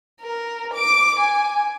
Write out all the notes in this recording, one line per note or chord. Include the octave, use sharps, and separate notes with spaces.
A#4
D6 D7
G#5